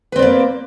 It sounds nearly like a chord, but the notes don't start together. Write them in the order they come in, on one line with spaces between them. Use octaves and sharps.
B4 C4 D5 A#3